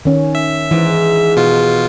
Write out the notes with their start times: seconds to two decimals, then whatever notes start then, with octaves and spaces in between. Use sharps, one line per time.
0.05 D#3 C#4
0.35 E5
0.71 G#2 E3
1.37 B2 F4